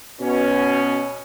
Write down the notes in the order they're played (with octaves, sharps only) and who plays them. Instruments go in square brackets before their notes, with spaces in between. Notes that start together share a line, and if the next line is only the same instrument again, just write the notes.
[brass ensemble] B2 C#4